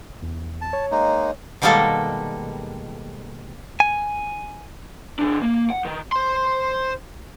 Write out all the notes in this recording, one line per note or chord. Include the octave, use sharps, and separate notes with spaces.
E2
A5
C#5
G#3 A#3 D#4
B2 D#3 G3 G#3 A#3 A4
G#5
E3 D4
A#3
F#5
D#3
C5 C6